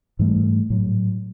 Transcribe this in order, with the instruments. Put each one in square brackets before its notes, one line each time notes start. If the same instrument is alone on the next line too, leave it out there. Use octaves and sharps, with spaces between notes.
[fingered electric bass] G#2 E3 G3 A3
A2 F#3